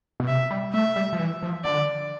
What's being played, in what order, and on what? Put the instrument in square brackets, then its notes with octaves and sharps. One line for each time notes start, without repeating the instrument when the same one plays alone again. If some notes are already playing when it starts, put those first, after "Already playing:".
[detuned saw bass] B2
[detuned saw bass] C3 [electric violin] E5
[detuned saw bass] G3
[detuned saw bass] A3 [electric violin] E5
[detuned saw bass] G3
F3
E3
F3
[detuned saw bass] D3 [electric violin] D5